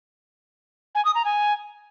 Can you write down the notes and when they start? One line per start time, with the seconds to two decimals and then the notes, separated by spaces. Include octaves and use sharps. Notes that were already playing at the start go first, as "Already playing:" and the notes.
0.95 G#5
1.05 D#6
1.15 A#5
1.25 G#5